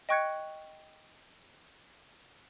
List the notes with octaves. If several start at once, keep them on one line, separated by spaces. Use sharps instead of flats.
D#5 G5 C#6 F#6 G#6 C#7